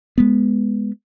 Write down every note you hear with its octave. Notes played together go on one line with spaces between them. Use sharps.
G#3 B3